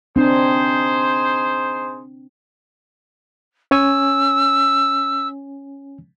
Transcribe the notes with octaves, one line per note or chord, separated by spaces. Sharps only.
C4 D4 D#4 G#4 C5
C#4 C#5 G#5 E6